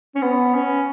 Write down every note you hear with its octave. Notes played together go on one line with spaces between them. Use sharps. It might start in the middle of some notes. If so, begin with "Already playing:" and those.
C#4
B3
C#4